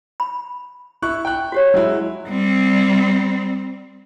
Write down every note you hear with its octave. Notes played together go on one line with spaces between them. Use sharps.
B5
E4 C#6 F#6
G5 F#6
F#4 G4 C#5
F#3 G#3 E4
G3 C4